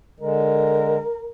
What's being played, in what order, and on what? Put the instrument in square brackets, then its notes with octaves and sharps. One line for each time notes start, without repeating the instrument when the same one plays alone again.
[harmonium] D3 G#3 [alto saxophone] A#4